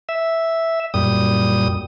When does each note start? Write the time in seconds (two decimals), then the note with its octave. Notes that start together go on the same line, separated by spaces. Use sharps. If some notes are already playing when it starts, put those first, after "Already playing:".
0.09 E5
0.94 F#2 A#2 G3 D#6